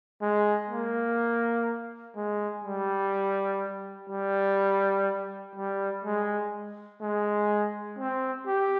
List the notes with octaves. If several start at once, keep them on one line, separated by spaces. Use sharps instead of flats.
G#3
A#3
G#3
G3
G3
G3
G#3
G#3
C4
G4